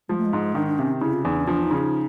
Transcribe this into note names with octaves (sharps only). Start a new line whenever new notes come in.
F3 G#3
A3
G#3
G#2
D#3 D4
D4
C3 C#4
C#3 E4
F4
E2 D#4
D4
F3 D4
D#4
C#3
D#4